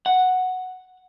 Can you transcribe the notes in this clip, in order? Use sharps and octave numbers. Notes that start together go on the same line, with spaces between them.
F#5